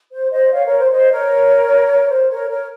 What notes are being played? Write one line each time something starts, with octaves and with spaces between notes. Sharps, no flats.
C5
C5 D#5
C#5 F5
A#4 C#5
C5
C5 D#5
A#4 C#5
C5
A#4 C#5
A#4 C#5